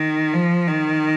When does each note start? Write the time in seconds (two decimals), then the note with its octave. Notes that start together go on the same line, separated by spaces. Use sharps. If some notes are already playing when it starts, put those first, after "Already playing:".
Already playing: D#3
0.34 F3
0.68 D#3